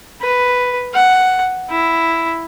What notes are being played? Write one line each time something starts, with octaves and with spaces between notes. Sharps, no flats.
B4
F#5
E4